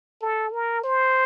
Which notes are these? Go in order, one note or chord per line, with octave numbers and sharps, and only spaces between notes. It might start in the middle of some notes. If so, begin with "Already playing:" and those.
A4
A#4
C5